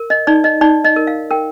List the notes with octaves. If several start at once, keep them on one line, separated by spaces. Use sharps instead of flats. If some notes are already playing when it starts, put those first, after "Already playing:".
Already playing: A#4
D#5
D#4 D5
D#5
D#4 D5
D#5
A#4
F5
A#4 G5